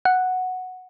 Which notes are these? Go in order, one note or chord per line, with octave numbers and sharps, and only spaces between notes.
F#5